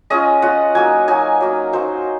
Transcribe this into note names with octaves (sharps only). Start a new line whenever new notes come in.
G#3 C#4 F4 D#5
G#3 C#4 F4 F#5
F#3 A#3 D#4 G#5
F#3 A#3 D#4 G#5
F#3 A#3 D#4
F#3 A#3 D#4 C5